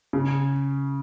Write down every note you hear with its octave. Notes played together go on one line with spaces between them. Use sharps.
C#3